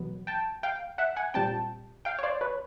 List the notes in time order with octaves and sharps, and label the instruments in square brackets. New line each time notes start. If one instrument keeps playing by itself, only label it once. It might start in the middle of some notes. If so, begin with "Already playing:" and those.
Already playing: [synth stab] E2 B2 F#3 B3
G5 A5
F5 G5
E5 F#5
F#5 G#5
A#2 G3 C4 G5 A5
F5 G5
C#5
C5 D5
B4 C#5